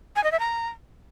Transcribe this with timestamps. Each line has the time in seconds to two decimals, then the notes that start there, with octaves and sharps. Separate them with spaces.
0.16 G#5
0.24 D#5
0.32 E5
0.39 A#5